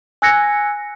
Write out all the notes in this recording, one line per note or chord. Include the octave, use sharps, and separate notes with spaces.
G#5 E6 F#6 G#6 A#6 C#7